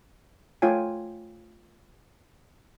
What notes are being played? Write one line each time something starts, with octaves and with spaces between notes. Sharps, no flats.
A3 F4 C#5 G5 G#5